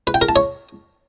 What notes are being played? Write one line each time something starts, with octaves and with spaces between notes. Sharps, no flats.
B4
G5
A#4
A5
C#5